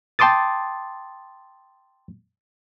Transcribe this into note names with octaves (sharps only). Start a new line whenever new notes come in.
G5 A5 C6 D6 D#6 A6